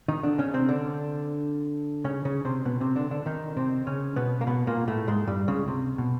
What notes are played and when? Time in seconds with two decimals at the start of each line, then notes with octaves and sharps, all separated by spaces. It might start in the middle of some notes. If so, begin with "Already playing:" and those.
0.08 D#3 D#4
0.23 D3 D4
0.38 C#3 C#4
0.54 C3 C4
0.69 D3 D4
2.04 C#3 C#4
2.25 C#3 C#4
2.45 C3 C4
2.65 B2 B3
2.80 C3 C4
2.96 D3 D4
3.11 D3 D4
3.26 D#3 D#4
3.57 C3 C4
3.87 C#3 C#4
4.16 B2 B3
4.41 A#3
4.47 B2 B3
4.67 A#2 A#3
4.88 A2 A3
5.07 G#2 G#3
5.27 G2 G3
5.48 C#2 C#3
5.68 C3
5.98 B2